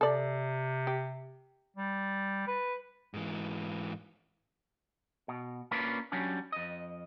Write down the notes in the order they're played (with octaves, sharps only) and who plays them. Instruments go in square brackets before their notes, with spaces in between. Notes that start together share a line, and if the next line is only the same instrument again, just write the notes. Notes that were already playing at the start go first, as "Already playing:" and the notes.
[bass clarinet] C3 [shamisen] A4 D5
[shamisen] G4
[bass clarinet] G3
B4
[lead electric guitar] G#2 E3
[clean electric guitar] B2
A#3 C#4 D4 F4 B4
F#3 G3 C#4 D4
F2 D#5